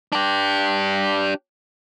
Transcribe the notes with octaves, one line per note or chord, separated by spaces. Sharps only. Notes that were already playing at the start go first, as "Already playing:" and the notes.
D4 G4